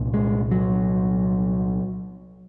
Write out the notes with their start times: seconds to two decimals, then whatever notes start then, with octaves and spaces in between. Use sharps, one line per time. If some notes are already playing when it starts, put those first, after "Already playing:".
Already playing: C2 A#2
0.14 G#3
0.51 F#3